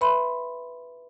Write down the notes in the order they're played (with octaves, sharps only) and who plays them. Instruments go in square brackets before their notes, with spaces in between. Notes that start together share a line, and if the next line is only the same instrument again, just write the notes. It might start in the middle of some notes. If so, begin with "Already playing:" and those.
[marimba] B4 E5 B5 C6